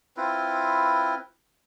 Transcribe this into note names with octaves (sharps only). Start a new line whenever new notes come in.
C4 E4 F4 B4